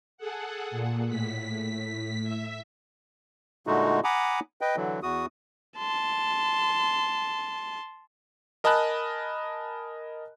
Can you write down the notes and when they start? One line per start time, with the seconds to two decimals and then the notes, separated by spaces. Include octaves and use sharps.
0.18 G#4 A4 F#5
0.71 A#2
1.08 A2 B6
2.23 E5
3.67 A#2 D3 G#3 A3 D#4 F#4
4.04 F#5 G#5 A#5 B5 D6 D#6
4.61 B4 D#5 G5
4.76 D3 E3 F#3
5.03 E2 F#4 D#6
5.77 A5 C6
8.64 A#4 D#5 G#5 A5 B5 F#6